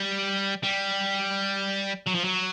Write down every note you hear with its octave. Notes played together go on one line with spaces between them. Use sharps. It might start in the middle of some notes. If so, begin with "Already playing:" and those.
Already playing: G3
G3
F#3
F3
F#3